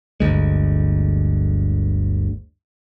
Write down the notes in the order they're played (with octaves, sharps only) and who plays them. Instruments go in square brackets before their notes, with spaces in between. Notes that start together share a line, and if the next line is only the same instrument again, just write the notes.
[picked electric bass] G1 D2 G#3